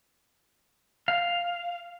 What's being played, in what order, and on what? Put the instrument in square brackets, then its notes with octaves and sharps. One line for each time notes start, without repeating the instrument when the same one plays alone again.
[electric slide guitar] F5